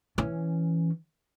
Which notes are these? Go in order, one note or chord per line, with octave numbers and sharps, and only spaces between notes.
E3 C#4